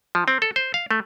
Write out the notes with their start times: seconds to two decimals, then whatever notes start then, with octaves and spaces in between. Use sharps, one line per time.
0.15 F3
0.28 C4
0.42 A4
0.56 C5
0.74 F5
0.91 A3